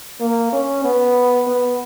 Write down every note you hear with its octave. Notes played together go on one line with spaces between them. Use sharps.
A#3
C#4
B3
B3